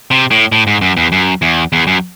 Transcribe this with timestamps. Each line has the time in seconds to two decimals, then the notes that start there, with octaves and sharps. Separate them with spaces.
0.11 C3
0.31 A2
0.52 A2
0.67 G#2
0.81 F#2
0.97 E2
1.12 F#2
1.42 E2
1.73 E2
1.87 F#2